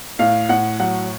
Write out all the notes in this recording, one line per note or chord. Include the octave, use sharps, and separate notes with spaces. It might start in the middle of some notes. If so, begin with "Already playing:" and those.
A2 F5
A2 F#5
F#3 F#5